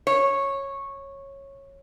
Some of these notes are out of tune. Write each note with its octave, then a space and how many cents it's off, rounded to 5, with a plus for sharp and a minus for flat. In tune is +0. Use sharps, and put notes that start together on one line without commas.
C#5 -10